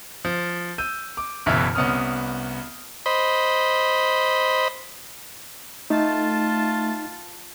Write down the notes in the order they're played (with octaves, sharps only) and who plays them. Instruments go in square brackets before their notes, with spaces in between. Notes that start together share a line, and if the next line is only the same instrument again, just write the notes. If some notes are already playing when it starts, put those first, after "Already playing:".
[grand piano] F3
E6 G6 D#7
D6
F#1 F#2 B2 E3 E5 F6
C2 B3 C#4 D#6 F6
[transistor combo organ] C5 D#5 B5
[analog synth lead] A3 [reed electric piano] D#4 [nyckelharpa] F4 A5